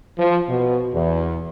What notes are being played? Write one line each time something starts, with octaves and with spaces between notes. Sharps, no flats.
F3
B2
E2